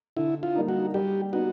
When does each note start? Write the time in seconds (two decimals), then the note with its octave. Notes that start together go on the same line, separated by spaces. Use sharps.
0.17 D3 E4
0.43 F4
0.55 G3 A#3 D#4
0.69 F#4
0.94 G3 G4
1.32 B3 D#4 F#4